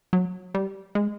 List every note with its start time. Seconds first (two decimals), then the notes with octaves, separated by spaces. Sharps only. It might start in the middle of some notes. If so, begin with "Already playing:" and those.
0.13 F#3
0.55 G3
0.95 G#3